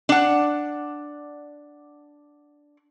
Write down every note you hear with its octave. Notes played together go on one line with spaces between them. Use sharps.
D4 F#5